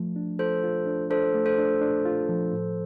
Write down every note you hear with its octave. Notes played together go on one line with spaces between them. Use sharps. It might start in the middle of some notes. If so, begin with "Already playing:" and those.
Already playing: F3 A3
D4
F4 A4 C5
F4
D4
D4 A4 C5
A3
A4 C5
D4
D4
F4
F3
A2